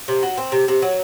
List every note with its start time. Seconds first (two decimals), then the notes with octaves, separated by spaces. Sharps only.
0.08 C3
0.23 F#3
0.37 C4
0.52 C3
0.68 C3
0.82 F#3